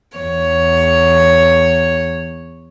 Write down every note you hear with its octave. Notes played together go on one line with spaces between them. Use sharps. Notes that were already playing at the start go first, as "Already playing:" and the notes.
E2 C#5